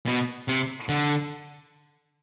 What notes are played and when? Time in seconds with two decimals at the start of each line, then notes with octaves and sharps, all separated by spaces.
0.06 B2
0.48 C3
0.89 D3